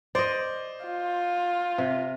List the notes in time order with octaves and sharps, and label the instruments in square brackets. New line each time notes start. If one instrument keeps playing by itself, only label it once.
[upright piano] C5 [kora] D5 D#5
[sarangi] F4
[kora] C3